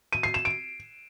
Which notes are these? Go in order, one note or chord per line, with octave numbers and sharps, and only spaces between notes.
D#7
C7
E7
D7